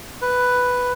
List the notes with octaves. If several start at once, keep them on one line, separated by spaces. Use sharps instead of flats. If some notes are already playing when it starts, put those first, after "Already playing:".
B4